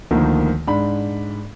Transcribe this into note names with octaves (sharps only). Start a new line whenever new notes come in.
D2 D#3 F3 A#3
G#2 D4 B5